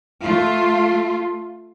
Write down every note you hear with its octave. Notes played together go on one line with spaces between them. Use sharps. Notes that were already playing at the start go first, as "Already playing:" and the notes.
A3 F4